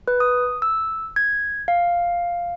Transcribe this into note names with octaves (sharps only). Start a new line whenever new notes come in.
B4
D#6
E6
G#6
F5